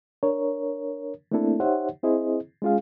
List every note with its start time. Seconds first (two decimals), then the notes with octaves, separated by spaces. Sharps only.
0.23 D4 A#4 C#5
1.31 A3 A#3 C4 D4 E4 A4
1.60 D#4 G4 C5 C#5 E5 F#5
2.03 C4 E4 G#4 C5 D#5
2.62 G#3 C#4 F4 G#4 F5